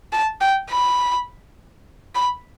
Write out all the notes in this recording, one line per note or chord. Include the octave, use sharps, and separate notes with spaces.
A5
G5
B5
B5